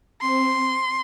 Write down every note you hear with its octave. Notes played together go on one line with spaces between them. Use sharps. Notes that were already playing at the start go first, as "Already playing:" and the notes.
C4 C6